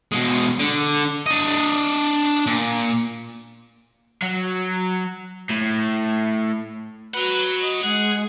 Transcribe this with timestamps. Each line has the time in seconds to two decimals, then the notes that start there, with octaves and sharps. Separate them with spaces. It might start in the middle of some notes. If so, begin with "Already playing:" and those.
0.12 B2 G#3
0.59 D3
1.26 D4 D#5
2.46 A#2
4.22 F#3
5.50 A2
7.14 F#4 B4 F#5 A#5
7.62 D#5
7.83 G#3 G#4 F#5